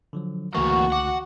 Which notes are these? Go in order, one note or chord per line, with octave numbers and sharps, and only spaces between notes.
D3 F3 F#3
C#2 D3 E3 A3 A#3 F#4 A#4 C#6
F#5 D6